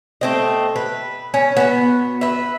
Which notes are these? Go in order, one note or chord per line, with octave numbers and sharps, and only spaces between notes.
A3 C4 D#5
B4
C#4
B3 F#4
B4 E5